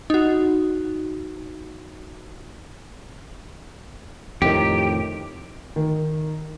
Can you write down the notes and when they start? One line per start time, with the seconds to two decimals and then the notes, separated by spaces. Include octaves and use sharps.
0.10 D#4 F#4
4.42 F2 A2 D#3 G4
5.76 D#3